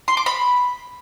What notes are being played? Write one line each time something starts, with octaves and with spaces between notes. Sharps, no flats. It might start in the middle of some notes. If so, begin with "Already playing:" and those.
C6
D6
B5